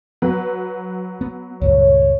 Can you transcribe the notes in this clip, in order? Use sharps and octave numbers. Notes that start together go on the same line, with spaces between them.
F#3 B4
B3
C#2 G2 A#2 C#5